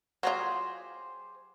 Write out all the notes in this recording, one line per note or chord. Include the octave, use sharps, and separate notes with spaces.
F#3 F4 G4 G#4 C5